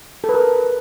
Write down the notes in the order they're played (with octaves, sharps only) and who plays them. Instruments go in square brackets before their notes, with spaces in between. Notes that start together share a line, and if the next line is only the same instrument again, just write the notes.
[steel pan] A4
B4
A#4